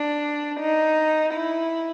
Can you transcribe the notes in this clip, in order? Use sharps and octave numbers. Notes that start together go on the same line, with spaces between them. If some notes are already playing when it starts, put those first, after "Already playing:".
Already playing: D4
D#4
E4